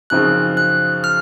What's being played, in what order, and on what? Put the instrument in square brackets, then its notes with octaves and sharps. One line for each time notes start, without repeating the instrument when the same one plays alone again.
[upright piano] F#2 C#3 F3 C4 D#4 [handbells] F#6
[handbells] F#6
F6